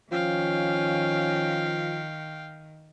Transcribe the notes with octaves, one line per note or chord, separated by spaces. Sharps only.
D#3 F3 C#4 F5 G5